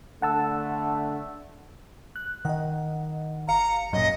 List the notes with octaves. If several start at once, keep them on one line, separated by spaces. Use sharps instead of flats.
D3 A3 F#5 A5 E6
F#6
D#3 D#5 F#5
G1 F5 A#5 C#7
F#2 A#2 D#5